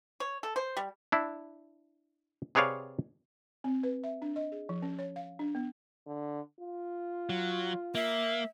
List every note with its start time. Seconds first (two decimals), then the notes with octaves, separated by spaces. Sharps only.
0.20 C#5
0.43 A4
0.56 C5
0.77 G3
1.12 D4 E4
2.55 C3 G#4 B4 C#5 D5 F5
3.64 C4
3.83 B4
4.04 E5
4.22 D4
4.36 D#5
4.52 G#4
4.69 F3
4.82 C#4
4.99 C#5
5.16 F5
5.39 D4
5.55 B3
6.07 D3
6.61 F4
7.29 F#3
7.95 A#3 E5